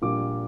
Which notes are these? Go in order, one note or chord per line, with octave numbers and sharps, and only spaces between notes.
A#1 A#2 G3 D6